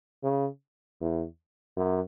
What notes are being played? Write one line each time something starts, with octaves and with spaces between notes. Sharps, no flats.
C#3
E2
F#2